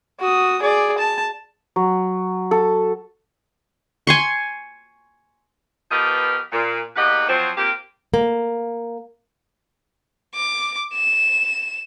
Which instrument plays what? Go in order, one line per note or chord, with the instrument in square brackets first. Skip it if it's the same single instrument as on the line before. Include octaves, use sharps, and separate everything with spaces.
[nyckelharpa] F#4 D#6
G#4 D5
A5
[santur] F#3
A4
[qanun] G#5 C6 C#6
[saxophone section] F3 B3 G4 A#4 B4 D#5
A#2
E2 A#3 G4 B4 D#5 F#5
F3 F#3 C4
A#3 C4 F4 G4
[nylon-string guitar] A#3
[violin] D6
E7